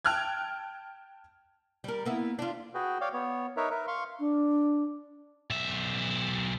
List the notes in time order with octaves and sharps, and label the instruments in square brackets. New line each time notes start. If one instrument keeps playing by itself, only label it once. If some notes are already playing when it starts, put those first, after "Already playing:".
[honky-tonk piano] G5 A5 F6 F#6 G#6
[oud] G3 A#4
A#3 B3 E4
D4 F4
[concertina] F#4 G#4 B4 G5
C#5 D5 F5 G5
B3 C#5
D#4 A#4 B4 C#5 E5
A#4 B4 E5
F5 C6 C#6
[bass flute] D4
[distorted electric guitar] B1 E5